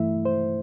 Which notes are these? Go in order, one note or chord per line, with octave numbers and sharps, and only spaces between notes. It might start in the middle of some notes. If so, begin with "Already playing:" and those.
Already playing: G2 E3 A3 E4 E5
C5